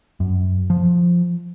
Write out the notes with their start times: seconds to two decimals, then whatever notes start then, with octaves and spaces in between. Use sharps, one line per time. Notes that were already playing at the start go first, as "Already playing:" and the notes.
0.20 F#2
0.70 F3